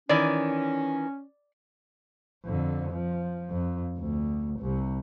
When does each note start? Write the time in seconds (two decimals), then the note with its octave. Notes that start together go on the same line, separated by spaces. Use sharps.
0.09 D#3 E3 C#4 D5
2.45 F2 D3
2.92 F3
3.50 F2
4.00 D2
4.61 C2 C3